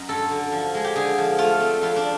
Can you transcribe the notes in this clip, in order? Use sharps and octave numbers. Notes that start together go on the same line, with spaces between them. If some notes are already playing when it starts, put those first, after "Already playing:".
Already playing: F#2 D#5
G2 A4
D3
F3
G#3
G4
D3 G#4
F3
A3 F4
C4
F2 F4
D4